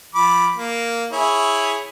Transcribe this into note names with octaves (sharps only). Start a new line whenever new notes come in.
F3 B5 D6
A#3
E4 G#4 C#5